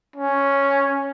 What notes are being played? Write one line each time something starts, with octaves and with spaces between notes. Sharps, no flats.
C#4